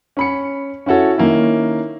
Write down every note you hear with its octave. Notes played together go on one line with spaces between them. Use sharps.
C#4 B5 C#7
C#4 E4 F#4 A4 C#5
D#3 A#3 C#4 E4